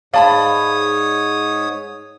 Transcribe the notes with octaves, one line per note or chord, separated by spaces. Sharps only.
G#2 C#5 D5 F5 A5 B5 D#6